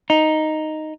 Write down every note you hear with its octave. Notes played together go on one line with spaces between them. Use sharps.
D#4